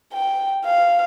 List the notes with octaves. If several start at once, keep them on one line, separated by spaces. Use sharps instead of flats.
G5
F5